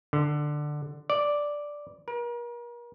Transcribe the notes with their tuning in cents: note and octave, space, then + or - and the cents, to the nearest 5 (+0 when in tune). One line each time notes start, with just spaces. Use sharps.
D3 +10
D5 +0
A#4 +40